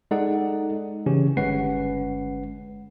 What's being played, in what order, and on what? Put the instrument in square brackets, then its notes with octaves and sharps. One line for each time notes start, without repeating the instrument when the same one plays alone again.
[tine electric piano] G#3 D#4 A4 D5 F#5
C#3 E3 C#4 G4
G1 G#3 C#4 B4 F#5 C7